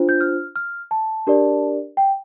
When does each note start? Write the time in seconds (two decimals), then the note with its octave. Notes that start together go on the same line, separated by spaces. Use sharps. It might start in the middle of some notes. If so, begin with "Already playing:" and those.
Already playing: D4 F4 C5
0.09 G6
0.21 F6
0.56 F6
0.91 A5
1.27 D4 G4 A#4 D5
1.97 G5